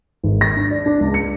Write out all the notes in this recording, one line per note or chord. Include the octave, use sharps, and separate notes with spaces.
G#1
A#6
D4
D5
D4
C#2
C#7